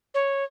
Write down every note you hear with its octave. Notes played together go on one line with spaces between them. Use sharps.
C#5